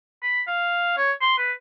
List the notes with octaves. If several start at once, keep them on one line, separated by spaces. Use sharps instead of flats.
B5
F5
C#5
C6
B4